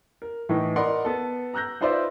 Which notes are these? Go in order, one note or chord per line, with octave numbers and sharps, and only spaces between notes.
A#4
A2 E3 D#4
A#4 D5 D#5 F#5 B5 C6
B3 A4
A#5 E6 F#6 G6 A#6
D#4 F4 B4 C5 D5 E5